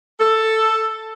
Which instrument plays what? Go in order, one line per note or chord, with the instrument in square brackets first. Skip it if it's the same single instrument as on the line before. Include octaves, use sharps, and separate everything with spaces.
[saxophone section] A4